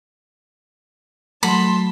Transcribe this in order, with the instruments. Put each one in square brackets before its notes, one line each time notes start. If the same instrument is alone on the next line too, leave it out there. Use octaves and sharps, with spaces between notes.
[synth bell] F#3 A3 [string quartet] A5 C6 [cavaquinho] B5